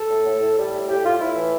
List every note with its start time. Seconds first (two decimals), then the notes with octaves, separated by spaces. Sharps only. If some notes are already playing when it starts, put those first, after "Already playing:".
Already playing: A4
0.09 A2
0.25 A2
0.41 A2
0.57 G3
0.72 A2
0.88 A2 G4
1.04 A2 F4
1.20 A2 E4
1.36 E3